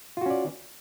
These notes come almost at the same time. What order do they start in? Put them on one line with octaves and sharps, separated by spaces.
F4 F#4 C#4 D5